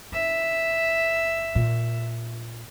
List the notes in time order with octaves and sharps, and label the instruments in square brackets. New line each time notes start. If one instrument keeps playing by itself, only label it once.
[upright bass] F#1 [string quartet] E5
[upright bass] A#2